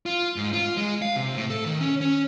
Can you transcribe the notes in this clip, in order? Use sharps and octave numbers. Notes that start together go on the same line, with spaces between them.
F4
G#2
F4
G#3
F5
C3
A2
A4
D#3
C#4
C#4